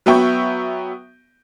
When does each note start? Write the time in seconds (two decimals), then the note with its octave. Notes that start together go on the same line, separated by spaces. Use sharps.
0.06 F#3 B3 E5 G5 C#6 G6